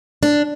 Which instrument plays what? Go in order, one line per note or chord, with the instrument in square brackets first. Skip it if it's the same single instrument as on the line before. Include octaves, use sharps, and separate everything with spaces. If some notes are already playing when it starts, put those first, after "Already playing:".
[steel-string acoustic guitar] D4